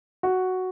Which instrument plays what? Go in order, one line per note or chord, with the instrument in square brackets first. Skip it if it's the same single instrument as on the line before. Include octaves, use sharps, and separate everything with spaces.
[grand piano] F#4